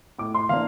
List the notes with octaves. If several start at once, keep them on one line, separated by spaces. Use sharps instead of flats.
A2 D6
C6
E3 A#3 D4 F5